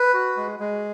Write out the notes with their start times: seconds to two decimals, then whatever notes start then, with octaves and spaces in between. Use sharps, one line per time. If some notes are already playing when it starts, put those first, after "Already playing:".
Already playing: B4
0.14 F#4
0.37 G#3
0.60 G#3